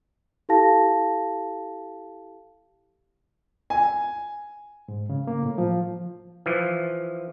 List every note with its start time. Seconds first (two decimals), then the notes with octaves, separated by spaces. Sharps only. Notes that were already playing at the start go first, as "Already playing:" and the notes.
0.49 E4 G4 A4 F5 A5 A#6
3.70 G#5
4.88 G#2
5.10 C#3
5.27 A#3
5.43 A2
5.58 F3
6.46 E3 F3